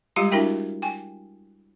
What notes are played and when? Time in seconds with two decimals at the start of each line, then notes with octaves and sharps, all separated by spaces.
0.16 G3 G#3 F4 G4 F5 A#5
0.32 D4 E4 F#4 A#4 E5 G5
0.82 G5 G#5